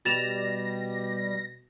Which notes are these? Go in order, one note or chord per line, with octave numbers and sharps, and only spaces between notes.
B2 G3 A6 A#6 E7 F7